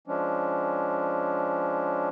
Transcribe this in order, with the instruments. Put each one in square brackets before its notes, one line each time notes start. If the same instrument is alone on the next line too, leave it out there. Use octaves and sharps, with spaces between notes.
[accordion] F3 G#3 C#4 D4